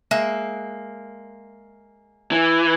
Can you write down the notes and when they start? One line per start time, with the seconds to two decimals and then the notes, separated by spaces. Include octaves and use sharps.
0.11 G#3 A#3 E5
2.32 E3